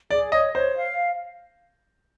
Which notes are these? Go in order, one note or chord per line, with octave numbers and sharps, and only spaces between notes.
G#4 D5
C#5 D#5
C5 C#5
F5